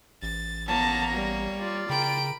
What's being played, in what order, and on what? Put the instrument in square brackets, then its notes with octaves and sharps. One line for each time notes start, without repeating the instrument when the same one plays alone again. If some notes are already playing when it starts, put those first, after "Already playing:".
[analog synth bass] A1 [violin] A6
[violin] A#3 C#5 [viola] B3 A#5 [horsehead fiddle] A5
[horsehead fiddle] G3
[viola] F4 D5
[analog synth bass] C#3 [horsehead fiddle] A#4 G5 [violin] B5 D7